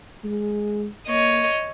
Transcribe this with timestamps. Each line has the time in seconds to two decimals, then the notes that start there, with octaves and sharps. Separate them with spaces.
0.24 G#3
1.08 A#3 C#5 D#5